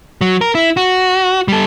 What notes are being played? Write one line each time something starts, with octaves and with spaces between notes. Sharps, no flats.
F#3
A#4
E4
F#4
G3 A4